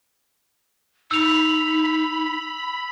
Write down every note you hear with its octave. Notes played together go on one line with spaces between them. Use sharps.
D#4 B5 E6 F7